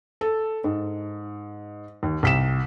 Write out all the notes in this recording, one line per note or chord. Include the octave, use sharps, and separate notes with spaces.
A4
G#2
D#2
C2 B6 E7